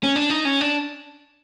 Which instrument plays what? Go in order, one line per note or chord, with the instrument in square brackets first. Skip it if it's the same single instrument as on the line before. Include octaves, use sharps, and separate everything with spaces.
[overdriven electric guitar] C#4
D4
D#4
C#4
D4